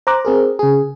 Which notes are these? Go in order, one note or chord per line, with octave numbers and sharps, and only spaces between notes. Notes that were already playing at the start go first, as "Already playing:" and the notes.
C5 A#5 D6 F#6
C4 G#4 A#4
C#3 G#4